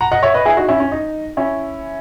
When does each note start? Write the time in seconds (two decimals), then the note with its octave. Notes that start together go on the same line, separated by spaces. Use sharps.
0.01 F#5 A#5
0.12 D#5 F#5
0.23 C#5 E5
0.34 B4 D#5
0.45 E4 G#4
0.57 D#4 F#4
0.69 C#4 E4
0.80 C#4
0.92 D#4
1.37 C#4 E4